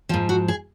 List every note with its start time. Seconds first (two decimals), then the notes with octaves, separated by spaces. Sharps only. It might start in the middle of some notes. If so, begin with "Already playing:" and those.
0.09 F3 F4
0.14 G#2
0.29 F#4
0.48 G#4